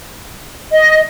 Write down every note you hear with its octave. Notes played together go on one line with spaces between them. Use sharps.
D#5